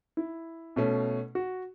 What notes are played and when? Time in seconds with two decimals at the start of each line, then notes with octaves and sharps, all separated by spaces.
0.17 E4
0.76 B2 A3 C#4
1.35 F#4